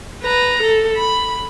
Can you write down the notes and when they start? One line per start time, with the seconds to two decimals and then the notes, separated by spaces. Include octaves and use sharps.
0.23 B4 A#5
0.62 A4
0.96 B5